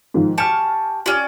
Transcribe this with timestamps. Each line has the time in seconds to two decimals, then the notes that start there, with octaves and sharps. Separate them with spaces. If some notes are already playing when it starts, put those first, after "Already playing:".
0.14 G#2 D#3 F3
0.38 G4 G#5 A5 C#6 F6
1.06 C#4 F4 G4 D5